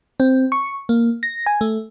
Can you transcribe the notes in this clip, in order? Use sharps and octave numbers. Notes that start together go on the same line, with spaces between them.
C4
C#6
A#3
A#6
G#5
A3